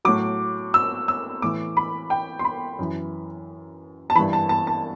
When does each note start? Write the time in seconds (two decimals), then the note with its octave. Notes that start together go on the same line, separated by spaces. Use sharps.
0.05 A2 F#3 D6
0.74 E6
1.08 E6
1.42 A2 E3 D6
1.77 B5
2.10 G5
2.39 C6
2.45 B5
2.79 F#2 E3
4.10 A5
4.15 E3 B5
4.19 G2
4.33 A5
4.49 A5
4.67 A5